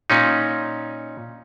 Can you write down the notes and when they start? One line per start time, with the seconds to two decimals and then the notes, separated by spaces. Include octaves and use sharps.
0.10 A#2 C#4 D#4